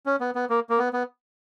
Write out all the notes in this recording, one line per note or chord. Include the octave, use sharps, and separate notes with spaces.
C#4
B3
B3
A#3
A#3
B3
B3